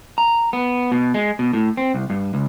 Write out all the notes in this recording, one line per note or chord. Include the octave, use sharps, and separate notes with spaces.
A#5
B3
B2
G#3
B2
A2
C4
C2
G2
C#2